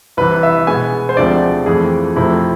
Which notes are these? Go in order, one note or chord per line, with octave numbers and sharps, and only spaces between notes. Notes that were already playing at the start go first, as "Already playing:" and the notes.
C2 C3 E3 B4
E5
B2 G#3 B3 G#5
C5
D2 C3 F3 G#3 C4 D5
F2 E3 A3 C4 G#4
F2 C3 F3 A3 C4 E4